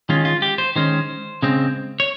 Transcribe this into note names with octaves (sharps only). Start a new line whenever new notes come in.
D#3 G#3 C#4 F4
F4
G4
C5
D#3 G#3 C#4 C5
C#3 G#3 C4
C#5